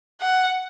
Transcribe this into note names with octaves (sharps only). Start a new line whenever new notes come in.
F#5